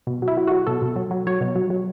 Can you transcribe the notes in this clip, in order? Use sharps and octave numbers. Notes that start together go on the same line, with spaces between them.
B2
F#3
E4
F#3
F#3 F#4
B2 A4
B2
F#3
F#3
F#3 C#5
B2
F#3
F#3